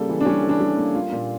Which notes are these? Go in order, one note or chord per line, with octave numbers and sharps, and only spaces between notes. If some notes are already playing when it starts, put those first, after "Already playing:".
Already playing: C#3 G3 A#3 A4
E3
D4
G3 C#4
E3
D4
G3
A#3
A#3 F4
A#2